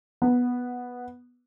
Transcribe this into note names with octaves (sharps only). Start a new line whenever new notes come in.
B3